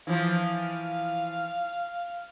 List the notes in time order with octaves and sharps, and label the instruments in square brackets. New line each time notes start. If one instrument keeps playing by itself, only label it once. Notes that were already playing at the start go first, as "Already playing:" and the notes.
[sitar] E3 F3 [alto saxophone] F5